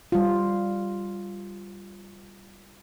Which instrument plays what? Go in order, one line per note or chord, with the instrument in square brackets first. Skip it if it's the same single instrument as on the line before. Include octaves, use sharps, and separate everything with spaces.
[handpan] G3 F4